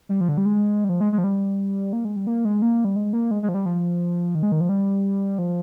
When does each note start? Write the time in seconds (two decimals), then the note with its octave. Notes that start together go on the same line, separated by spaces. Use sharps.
0.09 G3
0.21 F3
0.29 D3
0.38 G3
0.46 G#3
0.84 G3
0.89 F3
1.01 G#3
1.12 G#3
1.18 F3
1.24 G3
1.93 A#3
2.05 G#3
2.16 G3
2.27 A#3
2.45 G#3
2.62 A#3
2.85 G3
2.96 G#3
3.13 A#3
3.31 G#3
3.43 G#3
3.49 F3
3.54 G3
3.66 F3
4.35 D#3
4.43 G#3
4.52 D#3
4.61 F3
4.69 G3
5.39 F3